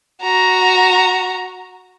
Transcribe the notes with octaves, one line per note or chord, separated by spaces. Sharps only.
F#4 A#5